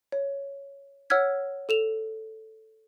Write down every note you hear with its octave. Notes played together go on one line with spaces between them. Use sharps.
C#5
C#5 F#5 E6 F6 G#6 B6
A4 E7 F7